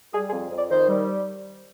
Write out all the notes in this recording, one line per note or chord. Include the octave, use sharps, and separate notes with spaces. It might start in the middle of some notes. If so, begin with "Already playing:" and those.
G3 G#4
G#4
F2
F2
D5
D#3 C5
G3